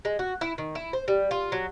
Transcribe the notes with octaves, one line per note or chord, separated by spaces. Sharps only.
G#3
F#4
E4
D#3
E4
C5
G3
F4
F#3